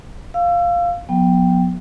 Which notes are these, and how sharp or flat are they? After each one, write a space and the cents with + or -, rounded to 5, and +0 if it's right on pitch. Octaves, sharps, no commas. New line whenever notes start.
F5 +0 E6 +25
F#3 -45 B3 -10 G5 +0